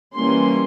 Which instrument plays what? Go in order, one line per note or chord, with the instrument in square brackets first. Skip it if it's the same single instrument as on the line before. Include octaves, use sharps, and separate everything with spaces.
[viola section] E3 G3 A#3 C#4 C6